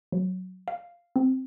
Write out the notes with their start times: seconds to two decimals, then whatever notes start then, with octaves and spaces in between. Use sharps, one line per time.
0.12 F#3
0.68 F5
1.16 C4